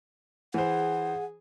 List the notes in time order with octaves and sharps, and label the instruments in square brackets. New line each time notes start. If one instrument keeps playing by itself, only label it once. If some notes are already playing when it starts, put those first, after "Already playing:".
[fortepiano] E3 C5 [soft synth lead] G#4 [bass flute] F#5